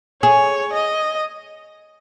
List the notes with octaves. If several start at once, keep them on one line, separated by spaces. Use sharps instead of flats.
G#4 C#5
D#5